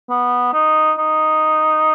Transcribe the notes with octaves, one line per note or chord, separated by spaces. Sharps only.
B3
D#4
D#4